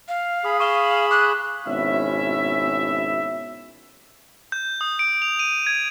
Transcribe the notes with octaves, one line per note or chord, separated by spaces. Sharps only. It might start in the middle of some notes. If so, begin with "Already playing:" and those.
F5
G#4 B5 D#6
F5 C#6 E7 G7
F#7
D6 F#6
G#1 B2 C#4 E4 E5
G6
D#6
D7
F7
D#7
G#6